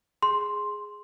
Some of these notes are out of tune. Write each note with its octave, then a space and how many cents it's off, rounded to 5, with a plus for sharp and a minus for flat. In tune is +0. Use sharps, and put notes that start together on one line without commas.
G#4 +0 C6 +0